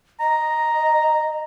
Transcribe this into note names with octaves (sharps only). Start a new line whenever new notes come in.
D#5 A#5